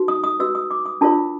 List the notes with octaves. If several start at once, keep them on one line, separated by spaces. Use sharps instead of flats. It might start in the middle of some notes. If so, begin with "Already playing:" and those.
Already playing: D#4 F#4 B4
D#6
D#6
F#4 B4 E6
D#6
D6
D#6
D4 F4 A#4 C#5 A5